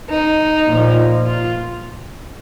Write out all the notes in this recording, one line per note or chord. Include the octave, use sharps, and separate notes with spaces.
D#4
A#2 F3
F4